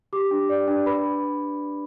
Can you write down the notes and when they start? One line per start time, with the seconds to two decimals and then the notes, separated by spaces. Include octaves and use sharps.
0.13 G4 D6
0.31 D4
0.49 D5
0.68 D4
0.86 B4 B5